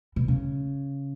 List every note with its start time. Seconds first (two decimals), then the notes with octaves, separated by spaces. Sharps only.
0.16 B2
0.28 C#3